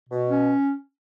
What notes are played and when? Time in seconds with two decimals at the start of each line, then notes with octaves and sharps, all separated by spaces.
0.09 B2
0.29 C#4